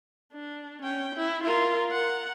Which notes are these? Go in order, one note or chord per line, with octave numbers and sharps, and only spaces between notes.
D4
C#4 G5
E4
F4 A#4
A#4 F#5